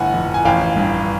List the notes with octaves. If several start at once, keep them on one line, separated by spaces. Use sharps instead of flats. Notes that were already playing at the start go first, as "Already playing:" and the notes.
Already playing: G1 A2 F#5 G#5
F2
G#5
A1 F5 G5
G2